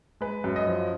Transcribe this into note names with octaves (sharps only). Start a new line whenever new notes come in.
G#3 B4
F#2
D#5
F3